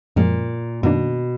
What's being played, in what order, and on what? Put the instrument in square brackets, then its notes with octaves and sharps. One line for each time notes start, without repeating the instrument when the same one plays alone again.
[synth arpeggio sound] F#2 F3 G#3 [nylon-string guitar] A#2
[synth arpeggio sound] F#2 D#3 A#3 D4 [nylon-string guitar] B2